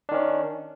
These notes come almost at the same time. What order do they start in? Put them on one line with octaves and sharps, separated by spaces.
D4 D#3 C#4